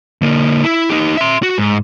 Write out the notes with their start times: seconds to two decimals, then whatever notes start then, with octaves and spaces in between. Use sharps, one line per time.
0.22 D3 A#3
0.64 E4
0.89 D#4 G4
1.17 E5 C6
1.43 F#4
1.58 G#2